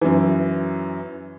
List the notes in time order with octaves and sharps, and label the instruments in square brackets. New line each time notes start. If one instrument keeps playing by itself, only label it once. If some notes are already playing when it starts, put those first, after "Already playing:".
[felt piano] F#2 E3